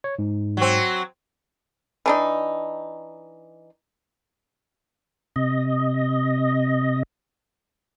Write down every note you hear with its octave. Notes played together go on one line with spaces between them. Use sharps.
C#5
G#2
F#3 C4
E3 D4 D#4
C3 D#5